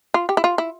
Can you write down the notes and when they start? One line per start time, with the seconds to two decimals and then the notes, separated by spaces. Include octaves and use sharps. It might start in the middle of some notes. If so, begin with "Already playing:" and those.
0.14 F4
0.29 G4
0.37 E4
0.44 F4
0.58 E4